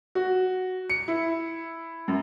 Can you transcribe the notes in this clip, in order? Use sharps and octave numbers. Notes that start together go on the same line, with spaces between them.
F#4
C#7
E4
F#2